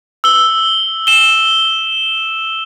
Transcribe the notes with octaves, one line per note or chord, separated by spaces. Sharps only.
E6 G7
E7 G7